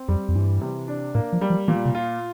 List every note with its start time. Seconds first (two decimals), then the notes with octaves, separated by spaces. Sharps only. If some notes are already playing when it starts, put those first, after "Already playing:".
Already playing: C4
0.08 F2 G3
0.28 F2
0.35 G2 E3
0.61 C3
0.88 D4
1.15 A2 A#3
1.33 F3
1.41 G3
1.50 F3
1.68 A#2 E3
1.85 C3
1.95 F4